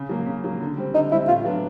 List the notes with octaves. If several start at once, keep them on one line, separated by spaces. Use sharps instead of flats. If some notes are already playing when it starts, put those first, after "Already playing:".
Already playing: C#3
F#3 A#3
C#3
F#3 A#3
D3
G3 C4
D3 D#4
G3 C4 E4
A2 F4
F#3 B3 D4